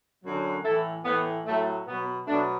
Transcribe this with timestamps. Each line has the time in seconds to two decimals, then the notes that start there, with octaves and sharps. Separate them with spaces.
0.24 F#2 D3 F#3
0.64 A2 E3 E4 A4
1.04 A2 E3 B3
1.46 A2 F#3 A3
1.86 B2 F#3 B3
2.27 B2 F#3 A3 D4